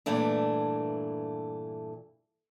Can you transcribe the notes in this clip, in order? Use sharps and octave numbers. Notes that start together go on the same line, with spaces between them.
G2 A#2 E3 A3 D4